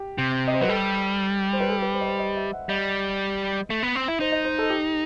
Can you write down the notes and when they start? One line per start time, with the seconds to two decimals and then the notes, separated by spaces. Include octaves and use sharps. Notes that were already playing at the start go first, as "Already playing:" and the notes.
Already playing: G4
0.18 C3
0.48 D#5
0.54 C5
0.61 F#3 B4
0.68 G3 A4
1.53 C5
1.60 B4
1.69 A4
1.82 B4
1.94 C5
2.01 D#5
2.07 C5
2.19 D#5
2.37 E5
2.53 F#5
2.69 G3 D#5
3.70 A3
3.83 B3
3.96 C4
4.08 E4
4.20 D#4 C5
4.32 D#5
4.45 C5
4.59 A4
4.70 G4